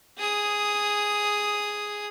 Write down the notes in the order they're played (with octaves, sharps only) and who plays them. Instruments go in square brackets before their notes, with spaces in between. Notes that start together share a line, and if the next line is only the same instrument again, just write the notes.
[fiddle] G#4 D#6